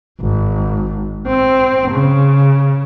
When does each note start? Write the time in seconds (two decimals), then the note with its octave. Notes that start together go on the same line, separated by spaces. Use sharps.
0.20 G#1
1.27 C4
1.90 C#3